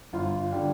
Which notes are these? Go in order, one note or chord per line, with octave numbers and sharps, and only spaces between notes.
G1 F4
D3 G3